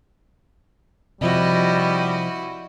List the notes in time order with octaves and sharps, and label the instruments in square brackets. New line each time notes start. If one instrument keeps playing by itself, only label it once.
[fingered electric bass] C3 F3 [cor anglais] G3 [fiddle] E4 F#4 [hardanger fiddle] D#5